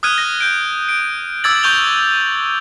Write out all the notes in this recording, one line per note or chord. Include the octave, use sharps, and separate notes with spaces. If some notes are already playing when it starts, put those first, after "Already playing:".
D#6 F6 F#6 G#6 D#7
A#6
G6 D7
D7
D6 E6 G#6 A6 F#7
C#6 G6 F7 G7